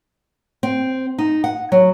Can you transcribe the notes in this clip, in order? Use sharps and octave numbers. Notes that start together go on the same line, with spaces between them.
C4
D#4
F#5
F#3